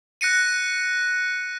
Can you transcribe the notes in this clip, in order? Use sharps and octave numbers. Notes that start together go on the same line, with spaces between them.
F#6 A#6 C#7 D#7